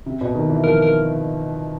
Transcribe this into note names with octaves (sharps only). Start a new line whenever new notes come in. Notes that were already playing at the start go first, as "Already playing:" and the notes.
C3
B2
D#3
E3
F3 A#4
A#4